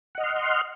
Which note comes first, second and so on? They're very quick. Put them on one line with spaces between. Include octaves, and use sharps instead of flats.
F#5 D#5 F6 C6